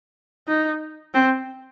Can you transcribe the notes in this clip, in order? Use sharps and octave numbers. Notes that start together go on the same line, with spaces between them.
D#4
C4